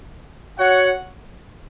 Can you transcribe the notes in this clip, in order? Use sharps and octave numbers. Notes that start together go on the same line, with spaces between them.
F#4 C#5 F#5